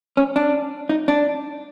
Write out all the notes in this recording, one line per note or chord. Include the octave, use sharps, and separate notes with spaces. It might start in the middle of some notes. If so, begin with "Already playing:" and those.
C#4
D4
D#4
D4